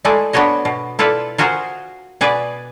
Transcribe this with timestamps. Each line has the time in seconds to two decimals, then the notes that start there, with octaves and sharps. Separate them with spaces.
0.05 G#3 A3 E4 G#4 D5
0.33 B3 D4 F#4 C#5 D#5
0.65 B2
0.99 E4 F4 A4 B4 D5
1.38 F4 F#4 G#4 A#4 C5
2.21 B2 G#4 B4 D5